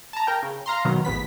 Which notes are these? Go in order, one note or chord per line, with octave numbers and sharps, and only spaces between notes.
A5 A#5
A#4 G5
C#3
F5 A#5 C6
B2 D#3 F#3 B3
A1 E2 B3 B6